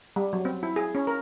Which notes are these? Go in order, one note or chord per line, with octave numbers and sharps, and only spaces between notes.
G3
F#3
C4
E4
G#4
C#4
A#4